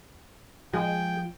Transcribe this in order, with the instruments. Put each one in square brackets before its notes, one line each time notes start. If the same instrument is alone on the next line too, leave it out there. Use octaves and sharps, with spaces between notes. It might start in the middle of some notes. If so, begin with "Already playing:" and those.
[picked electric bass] F3 [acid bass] G#3 [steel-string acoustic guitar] G#4 G#5 [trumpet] G5